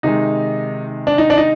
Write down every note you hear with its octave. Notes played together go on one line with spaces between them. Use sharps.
C3 D#3 G#3 D#4
D4
D#4
D4
D#4